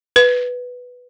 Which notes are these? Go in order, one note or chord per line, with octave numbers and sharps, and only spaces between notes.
B4